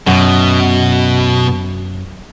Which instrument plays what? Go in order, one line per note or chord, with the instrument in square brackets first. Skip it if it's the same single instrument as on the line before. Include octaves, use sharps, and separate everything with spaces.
[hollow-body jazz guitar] F#2 [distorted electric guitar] B2